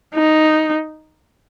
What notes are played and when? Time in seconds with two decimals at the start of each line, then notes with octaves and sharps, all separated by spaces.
0.14 D#4